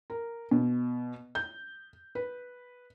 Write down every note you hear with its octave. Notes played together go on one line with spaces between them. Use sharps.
A#4
B2
G6
B4